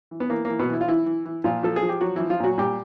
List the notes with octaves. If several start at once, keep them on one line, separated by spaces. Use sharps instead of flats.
E3
B3
E3 A#3
E3 A#3
B2 B3
E3 E4
F4
E3 E4
E3
E3
A#2 F3 F4
F3 A4
G#4
F3
G4
F3 F#3 F#4
E3 F3 E4
F3 F4
A#2 F#3 F#4
A#2 G3 G4